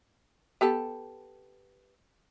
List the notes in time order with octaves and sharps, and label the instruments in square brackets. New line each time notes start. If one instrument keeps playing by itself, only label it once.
[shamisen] B3 G4 A4